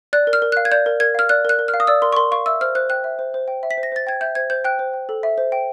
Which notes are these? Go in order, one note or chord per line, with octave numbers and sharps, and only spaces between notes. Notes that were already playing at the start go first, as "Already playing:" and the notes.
D5 F#6
A#4
F6
A#4
F5 F#6
G#6
D5 G6
A#4
A#4 G#6
F5 F6
D5 F#6
A#4 F#6
A#4
F6
F5
D#6
D5 E6
A#4 C6
C#6
A#4 C6
F5 C#6
E5 E6
C5 F6
C5 F#6
G5 F#6
E5
C5
C5
G5
E5
B6
C5
A#6
C5 A6
G5 G#6
E5 G6
C5 G#6
C5 G6
G5 F#6
C5
G5
A4
E5
C5
G5